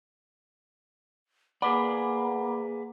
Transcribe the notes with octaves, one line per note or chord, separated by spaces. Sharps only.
A#3 G#4 B4 D5 F#5 B5 D6